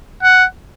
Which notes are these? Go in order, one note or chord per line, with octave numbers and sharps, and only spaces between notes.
F#5